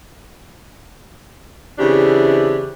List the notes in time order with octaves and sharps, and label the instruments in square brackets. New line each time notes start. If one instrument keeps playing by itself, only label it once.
[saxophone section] C#3 E3 C4 D4 E4 G4